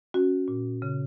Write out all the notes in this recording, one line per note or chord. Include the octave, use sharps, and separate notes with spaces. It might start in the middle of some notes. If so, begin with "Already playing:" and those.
C#4 F#4
A#2
C#3